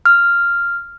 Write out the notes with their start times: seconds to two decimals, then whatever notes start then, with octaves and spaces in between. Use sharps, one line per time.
0.05 F6